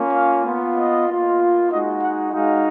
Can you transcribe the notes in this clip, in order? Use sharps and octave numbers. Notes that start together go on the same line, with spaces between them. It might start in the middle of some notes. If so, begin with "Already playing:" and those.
Already playing: A#3 C#4 F4
F5
B3 F4
D#5
A#3 F4
G#3 D#4 F#4 D#5
F#5
G#3 D#4 F#4 F5